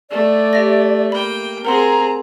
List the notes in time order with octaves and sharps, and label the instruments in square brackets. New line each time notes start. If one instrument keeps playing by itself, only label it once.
[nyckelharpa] A3 [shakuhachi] D5
[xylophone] G4 E5 A#6
[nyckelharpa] A#3 G5 [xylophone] B5
[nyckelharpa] C4 G#4 [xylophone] A#4 F#5 C6 [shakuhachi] A#5